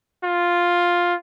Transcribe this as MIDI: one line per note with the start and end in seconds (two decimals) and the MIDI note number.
0.24 1.15 65